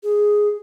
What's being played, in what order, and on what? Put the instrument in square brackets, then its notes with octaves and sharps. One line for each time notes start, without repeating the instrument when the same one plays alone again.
[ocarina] G#4